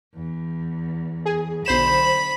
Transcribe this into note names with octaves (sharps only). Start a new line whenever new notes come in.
E2
G#4
B1 D3 C5 B5 E7